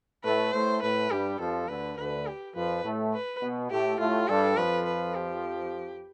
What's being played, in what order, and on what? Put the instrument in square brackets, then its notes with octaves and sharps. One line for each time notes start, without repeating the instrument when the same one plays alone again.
[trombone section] A2 A3 [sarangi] B4
[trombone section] A2 A3 [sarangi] C5
[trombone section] A2 A3 [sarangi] B4
[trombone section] G2 G3 [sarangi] G4
[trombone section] F2 F3 [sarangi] A4
[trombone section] D2 D3 [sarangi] B4
[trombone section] D2 D3 [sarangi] B4
[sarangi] G4
[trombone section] F2 F3 [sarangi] B4
[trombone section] A2 A3
[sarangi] B4
[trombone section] B2 B3
[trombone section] A2 A3 [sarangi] G4
[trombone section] A2 A3 [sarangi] F4
[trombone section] G2 G3 [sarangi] A4
[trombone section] F2 F3 [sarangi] B4
[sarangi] B4
G4